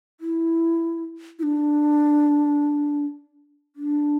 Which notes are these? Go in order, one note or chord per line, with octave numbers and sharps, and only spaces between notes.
E4
E4
D4
D4